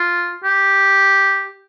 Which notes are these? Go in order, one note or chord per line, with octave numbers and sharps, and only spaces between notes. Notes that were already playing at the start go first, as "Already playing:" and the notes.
Already playing: F4
G4